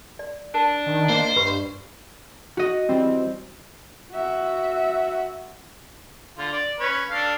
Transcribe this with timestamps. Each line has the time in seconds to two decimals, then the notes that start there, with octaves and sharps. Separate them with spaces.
0.19 D5
0.54 D4 A#4 A5
0.86 D#3
1.10 A#3 A#4 C5 D#5
1.36 G2 B4 B5 C#6
2.57 F#4 D#5
2.89 E3 G3 C4
4.12 F#4 E5
6.37 D3 F4
6.53 D5
6.79 C#4 B4 C#5
7.10 D4 A4 F5